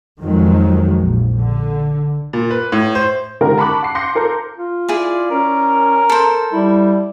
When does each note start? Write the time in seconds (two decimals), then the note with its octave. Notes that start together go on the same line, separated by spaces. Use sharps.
0.21 F2 D#3 F3 F#3 G#3
0.99 A#1
1.38 D3
2.33 A#2
2.51 B4
2.72 A2
2.95 C5
3.41 D3 D#3 G#3 G4 A#4
3.58 A5 B5 C#6 D6 F#6
3.83 F#5 C7
3.95 C6 D6 G6 A#6 C7 C#7
4.15 A4 A#4 A#5 C6 G6
4.58 F4
4.88 E4 G#4 D5
5.31 C#4 A#4
6.10 A4 C5
6.53 G3 E4